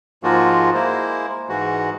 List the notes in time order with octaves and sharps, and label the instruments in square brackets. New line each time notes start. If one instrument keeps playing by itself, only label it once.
[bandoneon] G#2 F3 G#3 A#3 F4 F#4
G#3 A#3 E4 C5
G#2 E3 G#3 F#4